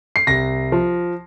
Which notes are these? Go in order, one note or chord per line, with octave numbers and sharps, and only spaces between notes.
C7
C2 A#6
F3